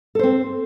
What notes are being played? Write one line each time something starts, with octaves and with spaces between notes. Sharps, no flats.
C4 A4 C5